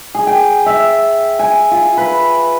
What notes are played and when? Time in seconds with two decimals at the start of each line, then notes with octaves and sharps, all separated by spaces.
0.15 G#4
0.27 G5
0.66 E5
1.39 G#5
1.71 F4
1.97 B4